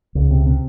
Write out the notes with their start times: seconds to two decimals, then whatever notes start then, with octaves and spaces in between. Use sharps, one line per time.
0.15 C#2
0.31 C3
0.46 C3